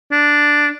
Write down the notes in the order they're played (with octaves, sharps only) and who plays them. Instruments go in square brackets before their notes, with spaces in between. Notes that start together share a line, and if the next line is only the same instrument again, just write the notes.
[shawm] D4